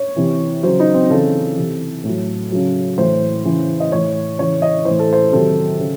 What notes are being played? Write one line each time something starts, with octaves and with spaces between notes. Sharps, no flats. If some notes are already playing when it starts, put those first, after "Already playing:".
Already playing: C#5
C3 E3
C#3 F#3 C5
D#4
C4
C#3 E3 A4
C3 E3
A2 F#3
C#3 F#3
A2 E3 C5
C#3 E3
D#5
A2 E3 C#5
C#3 E3 C#5
D#5
A2 E3 C5
A4
C5
C3 D#3 F#3 A4
C#3